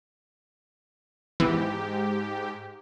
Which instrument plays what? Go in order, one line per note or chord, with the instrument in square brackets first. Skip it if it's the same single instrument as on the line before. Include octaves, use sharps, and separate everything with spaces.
[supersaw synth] G#2 G4 [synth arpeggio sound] E3 B3